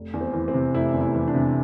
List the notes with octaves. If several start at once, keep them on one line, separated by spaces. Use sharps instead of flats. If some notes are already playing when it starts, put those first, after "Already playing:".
Already playing: F1
E2
C4
E3
C4
C3
F1 E4
E2
E4
E3
D4
C3